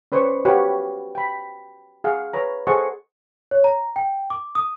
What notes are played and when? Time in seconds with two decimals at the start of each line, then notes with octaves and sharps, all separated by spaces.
0.12 C#4 B4 C5 D5 C#6
0.45 F#4 G4 B4 C#5 F5 F#5
1.15 G5 B5
2.04 G#4 F5 F#5
2.33 B4 C#5 A#5
2.67 G#4 A4 C5 D#5 F#5 C#6
3.51 C#5
3.64 A#5
3.96 G5
4.30 D6
4.55 D#6